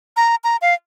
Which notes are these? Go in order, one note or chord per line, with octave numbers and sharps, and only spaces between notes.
A#5
A#5
F5